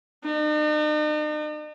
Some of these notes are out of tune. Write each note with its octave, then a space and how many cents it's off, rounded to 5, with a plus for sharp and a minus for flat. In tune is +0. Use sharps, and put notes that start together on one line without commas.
D#4 -45